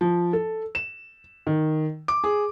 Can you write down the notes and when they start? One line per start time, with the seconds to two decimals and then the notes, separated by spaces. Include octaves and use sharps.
0.01 F3
0.33 A4
0.75 E7
1.47 D#3
2.08 D6
2.24 G#4